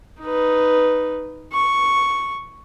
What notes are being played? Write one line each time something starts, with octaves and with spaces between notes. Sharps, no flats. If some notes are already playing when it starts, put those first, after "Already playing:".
D#4 B4
C#6